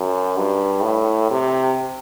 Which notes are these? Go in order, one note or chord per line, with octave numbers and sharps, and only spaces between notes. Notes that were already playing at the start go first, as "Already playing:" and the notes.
Already playing: F#2
G2
A2
C3